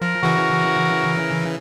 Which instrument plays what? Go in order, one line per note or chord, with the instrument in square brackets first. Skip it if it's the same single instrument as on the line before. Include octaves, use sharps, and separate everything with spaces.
[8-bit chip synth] F3 [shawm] A#4
[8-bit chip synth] C#3 E3 [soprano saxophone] F#4